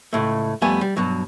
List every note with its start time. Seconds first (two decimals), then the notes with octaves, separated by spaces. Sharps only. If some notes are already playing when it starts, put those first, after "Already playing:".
0.13 C#2 A2 A3
0.62 F2 G3 A3 B3 G#5
0.81 G3
0.97 G2 B2 F#3